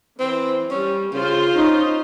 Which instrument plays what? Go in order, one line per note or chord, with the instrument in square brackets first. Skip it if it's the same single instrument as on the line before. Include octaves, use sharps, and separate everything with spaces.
[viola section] E3 [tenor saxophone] C4
[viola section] G3 [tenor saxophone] C#4
[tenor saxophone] C#3 [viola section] F4 C5 C6
[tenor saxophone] C#4 [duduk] D#4